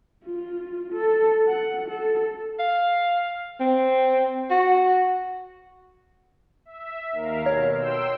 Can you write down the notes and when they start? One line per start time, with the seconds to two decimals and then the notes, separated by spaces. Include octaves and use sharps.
0.25 F4
0.93 A4
1.48 F#5
1.89 A4
2.60 F5
3.60 C4
4.51 F#4
6.65 E5
7.12 D#2 A#4 F5
7.46 B2 C#5
7.77 G5 C6 E6